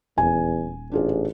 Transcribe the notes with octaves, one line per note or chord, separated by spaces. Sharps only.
D#1 E2 G#5
A1 D4 F4 G#4